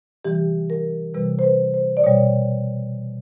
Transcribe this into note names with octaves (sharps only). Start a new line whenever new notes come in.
C3 E3 G3 G4
A#4
C3 E3 G3 B4
C5
B4
C5
D5
B2 G3 C#5